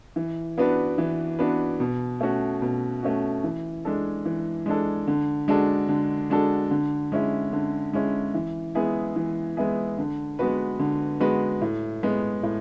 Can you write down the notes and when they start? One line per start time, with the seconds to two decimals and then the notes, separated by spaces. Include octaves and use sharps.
0.16 E3
0.58 B3 D4 F#4 B4
0.98 E3
1.39 B3 D4 F#4 B4
1.80 B2
2.21 A3 C#4 F#4
2.62 B2
3.03 A3 C#4 F#4
3.44 E3
3.85 G#3 D4 A4
4.25 E3
4.66 G#3 D4 A4
5.07 D3
5.48 G#3 D4 F#4 A4
5.89 D3
6.30 G#3 D4 F#4 A4
6.71 D3
7.12 G#3 C#4 E4
7.52 D3
7.93 G#3 C#4 E4
8.34 E3
8.75 G#3 B3 E4 G#4
9.16 E3
9.57 G#3 B3 E4 G#4
9.98 D3
10.39 G#3 B3 F#4 B4
10.79 D3
11.20 G#3 B3 F#4 B4
11.62 A2
12.03 G#3 B3
12.43 A2